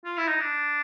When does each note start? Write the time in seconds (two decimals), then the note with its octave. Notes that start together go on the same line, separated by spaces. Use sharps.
0.05 F4
0.17 E4
0.28 D#4
0.40 D4